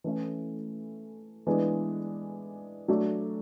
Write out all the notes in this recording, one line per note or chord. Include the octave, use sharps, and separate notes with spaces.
E3 A3 C#4 E4
E3 G#3 B3 D4
F#3 A3 D4